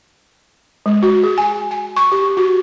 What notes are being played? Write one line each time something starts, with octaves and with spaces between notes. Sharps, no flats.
G#3
F#4
G#4
G#5
G#5
C#6
G4
F#4